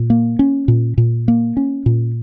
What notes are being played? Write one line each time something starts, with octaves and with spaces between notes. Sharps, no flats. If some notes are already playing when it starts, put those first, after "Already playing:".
Already playing: A#2
A#3
C#4
A#2
A#2
A#3
C#4
A#2